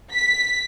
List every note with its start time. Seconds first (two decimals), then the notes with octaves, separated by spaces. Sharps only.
0.13 B6